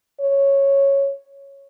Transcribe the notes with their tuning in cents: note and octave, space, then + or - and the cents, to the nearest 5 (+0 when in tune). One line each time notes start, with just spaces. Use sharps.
C#5 -5